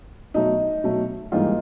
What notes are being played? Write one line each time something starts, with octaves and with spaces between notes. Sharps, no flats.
B2 F#3 A3 D#4
B2 F#3 A3
G#2 E3 G3 A#3 D#4 F4